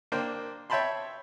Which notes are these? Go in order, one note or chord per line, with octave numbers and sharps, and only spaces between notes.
A#3 D4 C5 G5
C#5 E5 G5 A5 B5 C6